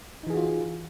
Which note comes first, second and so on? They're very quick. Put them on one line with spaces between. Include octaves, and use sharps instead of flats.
D#4 E3 G#4 F#4 F4